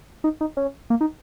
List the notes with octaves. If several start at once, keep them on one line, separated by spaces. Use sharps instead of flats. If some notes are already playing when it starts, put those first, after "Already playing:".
D#4
D#4
C#4
A#3
D#4